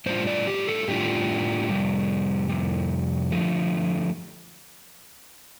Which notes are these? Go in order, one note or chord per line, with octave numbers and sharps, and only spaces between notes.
A2 G3 D4 F4 C5
D5
G4
A4
A2 G3 D4 F4 G4
F2 C3 G3
F2 C3 G3
D3 F3 A3